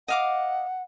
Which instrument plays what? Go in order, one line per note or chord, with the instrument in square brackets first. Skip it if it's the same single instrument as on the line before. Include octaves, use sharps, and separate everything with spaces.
[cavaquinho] D#5 F5 D6 [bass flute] F#5